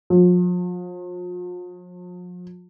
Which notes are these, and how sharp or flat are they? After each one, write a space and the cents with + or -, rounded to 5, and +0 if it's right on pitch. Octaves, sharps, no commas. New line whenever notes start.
F3 +40